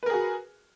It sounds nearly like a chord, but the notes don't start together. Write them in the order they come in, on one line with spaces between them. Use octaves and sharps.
B4 A#4 G#4 F#4